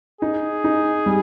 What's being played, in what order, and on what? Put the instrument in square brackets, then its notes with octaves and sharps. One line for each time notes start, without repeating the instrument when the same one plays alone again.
[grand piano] D#4 [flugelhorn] G#4
[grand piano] D#4
G3